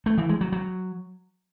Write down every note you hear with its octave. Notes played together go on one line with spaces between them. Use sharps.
A3
E3
G#3
F#3
F#3